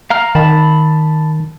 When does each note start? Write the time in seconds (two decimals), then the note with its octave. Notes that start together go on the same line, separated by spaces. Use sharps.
0.10 F5 A#5 F6
0.35 D#3 A5 B5